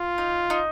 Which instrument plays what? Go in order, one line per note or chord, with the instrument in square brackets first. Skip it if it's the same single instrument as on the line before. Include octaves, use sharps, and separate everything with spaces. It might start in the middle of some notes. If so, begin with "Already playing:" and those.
Already playing: [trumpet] F4
[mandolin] D#4
D#4